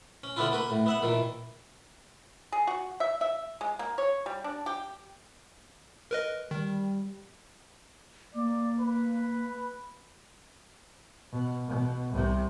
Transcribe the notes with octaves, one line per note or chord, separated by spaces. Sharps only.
C#4
D3 B3 C#4 D4 E4 F4
A#3 F#4 B4
A2
B3 E5 F#5
A#2 D#3 E3
G#4
F#4
E5
E5
G#3
A#3
C#5
G3
D4
G4
A#4 B4 D#5
D#3 G3
A#3 D5
B4
B2
B2
C2 C3